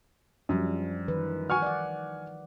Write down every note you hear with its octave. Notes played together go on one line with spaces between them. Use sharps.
F#2 F3 G3 D4
D#3 E3 B4
F#5 G#5 C#6 F6
D5 F#5